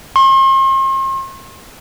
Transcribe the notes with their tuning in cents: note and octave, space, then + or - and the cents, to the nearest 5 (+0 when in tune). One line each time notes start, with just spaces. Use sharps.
C6 +45